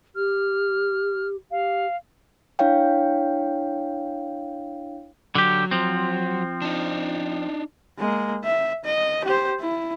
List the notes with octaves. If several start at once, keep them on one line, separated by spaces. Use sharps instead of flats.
G4 F6
G4 F5
D4 E4 C#5 F5 G5
D3 F#3 G4
F3 C4
D4 D#4
G#3 A#3
E5
D#5
G4 C5
E4